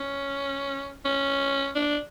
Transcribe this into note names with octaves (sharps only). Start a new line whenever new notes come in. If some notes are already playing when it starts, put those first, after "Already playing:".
Already playing: C#4
C#4
D4